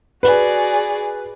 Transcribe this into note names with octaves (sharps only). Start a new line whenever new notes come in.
F#4 G#4 B4 D5